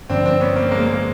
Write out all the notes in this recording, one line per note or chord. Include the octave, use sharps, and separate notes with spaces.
G2 D3 F3 C4 D4
C4 D4
B3 C#4
A#3 C4
G#3 A#3
G#3 A#3